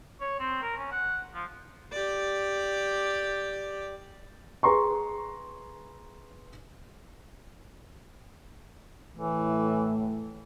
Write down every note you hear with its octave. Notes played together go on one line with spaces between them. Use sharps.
C#5
C4
A#4
C#4
F#5
F3
G4 D5
G#4 B4 A#5 C6 C#6
A2 E3